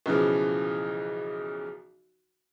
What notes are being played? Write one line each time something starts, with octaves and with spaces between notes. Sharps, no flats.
B1 C#3 E3 F3